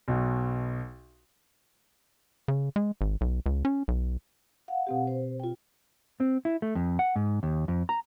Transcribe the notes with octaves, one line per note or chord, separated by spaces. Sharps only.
B1 B2
C#3
G#3
G#1
B1
C#2
C#4
B1
F5 F#5
B2 C4 G4
C5
F4 G5
C4
E4
A3
F2
F#5
G#2
D#2
F2
A#5